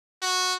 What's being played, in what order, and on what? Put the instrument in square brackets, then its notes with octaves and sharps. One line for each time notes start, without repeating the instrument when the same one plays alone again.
[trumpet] F#4